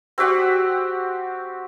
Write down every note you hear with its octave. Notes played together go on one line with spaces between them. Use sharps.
C4 F#4 G4 F#5